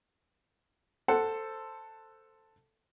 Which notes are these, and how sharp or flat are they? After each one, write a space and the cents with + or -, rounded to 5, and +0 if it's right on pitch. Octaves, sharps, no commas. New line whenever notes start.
A4 +10 C5 +0 F#5 +0